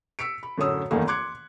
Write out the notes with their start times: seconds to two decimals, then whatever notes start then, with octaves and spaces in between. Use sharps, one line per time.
0.19 E6 B6 C#7 D7
0.43 B5
0.58 F#2 A2 D3 C#4 D#6 E6
0.91 F#1 E2 D#3 A3 A#3
1.07 C6 D6 F#6 G#6 C#7